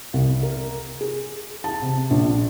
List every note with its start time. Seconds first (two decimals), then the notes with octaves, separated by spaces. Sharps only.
0.14 C2
0.43 A#4
1.01 G#4
1.64 A5
1.82 C3
2.11 A#1